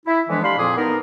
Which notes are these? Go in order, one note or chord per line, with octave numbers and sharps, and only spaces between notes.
E4
D3 E3 F3 G#3 B3 D4
D4 G4 F5 B5 C6
F2 A#2 F3 C4 G#4 D6
B3 D#4 A#4